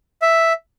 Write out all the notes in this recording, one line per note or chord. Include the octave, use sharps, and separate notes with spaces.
E5